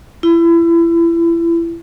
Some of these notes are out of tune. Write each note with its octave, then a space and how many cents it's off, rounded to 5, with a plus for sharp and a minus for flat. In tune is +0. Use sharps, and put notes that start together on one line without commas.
E4 +30